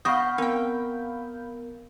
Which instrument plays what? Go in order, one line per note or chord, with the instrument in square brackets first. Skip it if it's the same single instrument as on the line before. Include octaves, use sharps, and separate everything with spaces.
[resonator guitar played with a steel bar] B3 D#5 [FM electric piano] F5 B5 G6 [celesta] F#5 C#6 D#6
[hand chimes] B3 A#4 [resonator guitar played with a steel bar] C4 G5